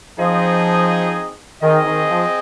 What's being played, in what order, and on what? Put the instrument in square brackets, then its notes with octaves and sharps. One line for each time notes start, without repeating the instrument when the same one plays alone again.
[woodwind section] F3 [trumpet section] C4 D#4 G#4 D#5
[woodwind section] D#3 [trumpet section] C4 G#4 D#5
[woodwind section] D#3
F3